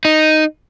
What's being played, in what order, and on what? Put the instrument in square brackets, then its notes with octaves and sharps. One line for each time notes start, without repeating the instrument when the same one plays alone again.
[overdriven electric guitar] D#4